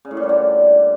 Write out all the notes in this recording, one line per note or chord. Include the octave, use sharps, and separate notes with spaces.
C#3
A2
A#2
G3
D3